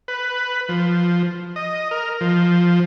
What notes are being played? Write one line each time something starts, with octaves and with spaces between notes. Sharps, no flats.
B4
F3
D#5
A#4
F3